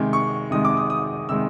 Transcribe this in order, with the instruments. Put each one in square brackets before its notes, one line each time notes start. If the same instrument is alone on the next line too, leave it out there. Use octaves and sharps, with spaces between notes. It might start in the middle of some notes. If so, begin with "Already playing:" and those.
Already playing: [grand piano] C3 D#3 G#3
C#6
C3 D#3 G#3 D#6
D6
D#6
D#6
C3 D#3 G#3 E6